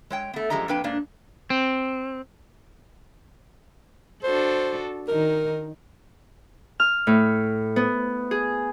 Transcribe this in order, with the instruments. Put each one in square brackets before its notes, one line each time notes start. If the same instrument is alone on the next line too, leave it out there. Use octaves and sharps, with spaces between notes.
[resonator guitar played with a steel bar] G#3 C#5 G5
A3 B3
F#2 F3 G#3 G4 D#5 A#5
F2 A#3 D4 B4 G5
G#2 A#3 D4
[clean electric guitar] C4
[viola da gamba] D4 F#4 A4 [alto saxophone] C5
[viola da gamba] D#3 D#4 [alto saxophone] A#4
[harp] F6
A2
B3
G#4